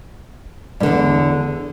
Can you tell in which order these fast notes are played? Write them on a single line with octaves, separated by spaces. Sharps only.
G2 D3 E2